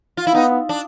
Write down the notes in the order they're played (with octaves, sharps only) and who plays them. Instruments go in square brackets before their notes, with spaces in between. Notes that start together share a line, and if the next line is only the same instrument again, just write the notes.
[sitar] F4
E4
[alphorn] B3 [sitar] D#4
[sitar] D4